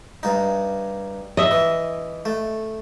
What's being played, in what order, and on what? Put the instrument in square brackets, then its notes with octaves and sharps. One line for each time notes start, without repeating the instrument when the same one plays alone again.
[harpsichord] G2 D#4
[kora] D#5 E5
[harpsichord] E3
A3